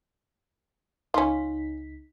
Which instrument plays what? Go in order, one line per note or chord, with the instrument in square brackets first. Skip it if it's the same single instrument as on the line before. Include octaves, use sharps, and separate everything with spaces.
[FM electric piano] C#2 D#4 B6 [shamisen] C#4 F4